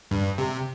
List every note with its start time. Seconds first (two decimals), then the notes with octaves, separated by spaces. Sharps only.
0.11 G2
0.38 C3